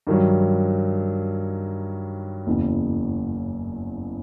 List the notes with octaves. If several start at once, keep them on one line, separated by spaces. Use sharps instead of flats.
G2 D#3 F#3
F#1 E2 C#3